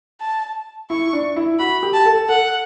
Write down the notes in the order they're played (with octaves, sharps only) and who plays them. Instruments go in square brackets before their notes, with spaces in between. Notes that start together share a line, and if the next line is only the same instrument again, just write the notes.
[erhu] A5
[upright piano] E4 [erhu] C#6
[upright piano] D4
E4
[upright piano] F#4 [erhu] B5
[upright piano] G4
[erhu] A5
[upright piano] A4
[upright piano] A4 [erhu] F#5